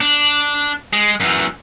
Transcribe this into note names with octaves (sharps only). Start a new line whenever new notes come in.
D4
G#3
F#2 E3